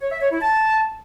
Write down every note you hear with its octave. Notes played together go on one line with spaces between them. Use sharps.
C#5
E5
C#5
E4
A5